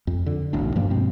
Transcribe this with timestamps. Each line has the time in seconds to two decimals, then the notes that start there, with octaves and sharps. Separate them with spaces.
0.07 F2
0.26 D3
0.53 E1 B1 A2 D4
0.76 G2 F3 A#3 D4
0.90 G2 B2 G#3 C4